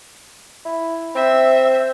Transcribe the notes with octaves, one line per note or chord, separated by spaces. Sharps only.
E4
C4 E5